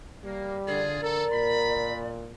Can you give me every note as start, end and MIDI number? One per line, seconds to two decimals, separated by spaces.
0.24 0.87 55
0.24 0.56 58
0.67 0.97 50
0.67 0.99 65
0.67 0.99 68
0.67 2.09 74
1.02 1.26 50
1.02 1.23 69
1.02 1.93 70
1.32 2.32 46
1.32 1.99 83